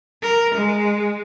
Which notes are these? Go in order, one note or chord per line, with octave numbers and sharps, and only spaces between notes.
A#4
G#3